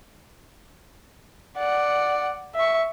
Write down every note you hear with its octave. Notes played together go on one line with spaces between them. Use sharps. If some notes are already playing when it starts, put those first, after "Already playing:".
D5 F#5
E5 C#6